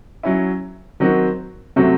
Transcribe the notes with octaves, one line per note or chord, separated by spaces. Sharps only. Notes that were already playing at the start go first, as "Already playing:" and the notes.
F#3 C#4 E4
D#3 F#3 C4 F#4
C3 F#3 A3 C4 F#4